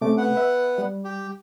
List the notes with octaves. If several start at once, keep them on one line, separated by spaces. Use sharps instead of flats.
C3 A3 C#4 D6
B3 F#5
B4 E5
G3
G4